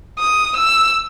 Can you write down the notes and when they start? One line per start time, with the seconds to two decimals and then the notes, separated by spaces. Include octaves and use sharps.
0.19 D#6
0.57 E6